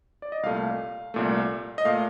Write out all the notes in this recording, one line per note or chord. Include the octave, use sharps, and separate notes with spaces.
D5
D#5
C2 A#2 A3 F5
C2 A#2 A3
D#5
A#2 A3 F5